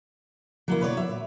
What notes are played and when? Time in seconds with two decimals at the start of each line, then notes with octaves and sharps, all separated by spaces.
0.68 D3 F#3 A#3 E4
0.81 B2 B4 C#5 D5
0.97 F#3 E5
1.09 A#2